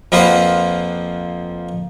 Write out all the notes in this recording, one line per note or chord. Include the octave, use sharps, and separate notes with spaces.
F2 F3 A#3 F4 B4 F#5